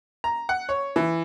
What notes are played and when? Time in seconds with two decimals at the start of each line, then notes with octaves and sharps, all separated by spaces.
0.24 A#5
0.49 F#5
0.69 C#5
0.96 E3